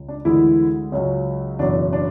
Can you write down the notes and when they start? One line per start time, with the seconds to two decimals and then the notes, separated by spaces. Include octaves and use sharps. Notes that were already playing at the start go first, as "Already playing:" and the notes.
Already playing: C#2 C#3
0.08 D4
0.25 D2 D3 E3 G#3 E4
0.92 C#2 C#3 F#3
1.59 F#1 E2 B2 F#3 D4
1.93 D4